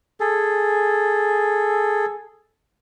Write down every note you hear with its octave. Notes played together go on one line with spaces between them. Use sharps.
G#4 A4